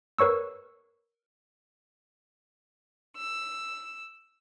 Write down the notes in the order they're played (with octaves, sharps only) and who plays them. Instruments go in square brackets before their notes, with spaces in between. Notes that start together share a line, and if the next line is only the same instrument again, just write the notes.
[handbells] A#4 B4 C#5 C#6 E6
[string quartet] E6